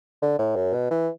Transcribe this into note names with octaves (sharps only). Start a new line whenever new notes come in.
D3
A2
F#2
B2
E3